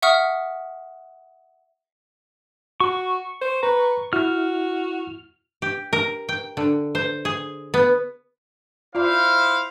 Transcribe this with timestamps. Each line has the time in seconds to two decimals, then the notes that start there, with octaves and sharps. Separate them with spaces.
0.02 E5 F#5 C#6 D#6 F6
2.80 F#4 C#6
3.41 C5
3.63 B4 A#5
4.13 E4 F#4 F6
5.62 G4
5.93 A#4
6.29 G5
6.57 D3
6.95 C5
7.25 G#4
7.74 B3
8.95 E4 F4 C5 D5 F5